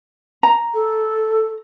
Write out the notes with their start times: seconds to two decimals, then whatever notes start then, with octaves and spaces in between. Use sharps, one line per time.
0.43 A#5
0.74 A4